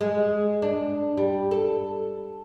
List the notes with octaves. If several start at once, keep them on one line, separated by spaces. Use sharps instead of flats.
G#3
D4
G3
A4